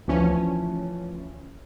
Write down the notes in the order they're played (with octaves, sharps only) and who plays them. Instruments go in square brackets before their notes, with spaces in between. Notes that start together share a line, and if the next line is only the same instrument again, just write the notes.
[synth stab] D2 C#4 [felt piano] E3 F3